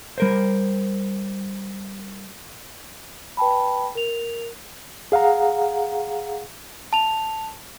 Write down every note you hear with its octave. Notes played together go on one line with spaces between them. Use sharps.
G3 A#4 C5
B4 G5 A5 B5
A#4 F7
G#4 F5 F#5 A#5
A5 F7